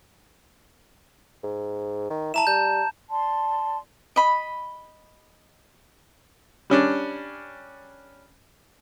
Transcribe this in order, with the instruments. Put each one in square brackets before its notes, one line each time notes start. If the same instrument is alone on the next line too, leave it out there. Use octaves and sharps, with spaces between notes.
[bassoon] G#2
D#3
[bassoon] E4 [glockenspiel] A5 A#5 E7
[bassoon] G3 [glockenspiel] G6
[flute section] D5 A5 C6
[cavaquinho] D#5 B5
[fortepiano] G3 C#4 D4